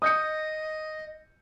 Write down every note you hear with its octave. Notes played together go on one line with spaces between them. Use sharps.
D#5 D#6 G6 C#7